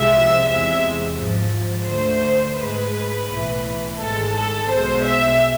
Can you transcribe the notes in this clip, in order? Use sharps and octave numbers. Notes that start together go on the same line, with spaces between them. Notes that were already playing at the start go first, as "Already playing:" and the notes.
Already playing: C2 C3 F3 G#3 E5
E2 C3 G#3 E5
G#1 G#2 F3
D2 D3 A3 C5
G#2 G#3 B4
B1 A2 E3
G#1 G#2 G#3 A4
A4
B1 B2 G#3 C5
E5